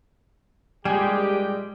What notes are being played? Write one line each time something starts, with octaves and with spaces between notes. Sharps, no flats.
A#1 G3 G#3 G4 G#4 G5